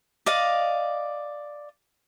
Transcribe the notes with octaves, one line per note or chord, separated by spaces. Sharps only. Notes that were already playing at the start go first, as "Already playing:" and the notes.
D5 D#5 F5